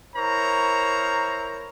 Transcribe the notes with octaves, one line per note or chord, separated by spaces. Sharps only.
E4 A#4 C5 C#5 A#5